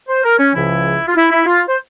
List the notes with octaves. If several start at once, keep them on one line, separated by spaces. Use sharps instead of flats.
C5
A#4
C#4
C#2 C#3 F3 E4
F4
E4
E4
F4
C5